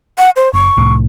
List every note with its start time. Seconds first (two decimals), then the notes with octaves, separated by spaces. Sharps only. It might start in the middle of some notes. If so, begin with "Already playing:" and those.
0.18 F#5
0.36 C5
0.53 F#1 C#6
0.77 C2 A2